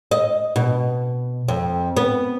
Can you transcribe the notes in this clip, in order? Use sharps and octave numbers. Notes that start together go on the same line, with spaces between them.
D#5
B2
F2
B3